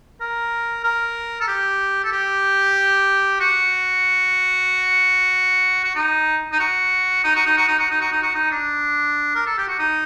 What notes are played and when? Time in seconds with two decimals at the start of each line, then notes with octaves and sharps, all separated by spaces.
0.21 A#4
0.84 A#4
1.41 A4
1.48 G4
2.04 A4
2.12 G4
3.40 F#4
5.84 F#4
5.96 D#4
6.52 D#4
6.60 F#4
7.24 D#4
7.35 F#4
7.46 D#4
7.58 F#4
7.68 D#4
7.79 F#4
7.91 D#4
8.01 F#4
8.12 D#4
8.23 F#4
8.35 D#4
8.52 D4
9.36 A#4
9.47 A4
9.58 G4
9.68 F#4
9.79 D#4